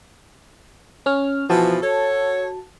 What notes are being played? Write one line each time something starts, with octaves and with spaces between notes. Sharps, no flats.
C#4 C#5 F6
B2 E3 F3 F#4 A5
A4 C#5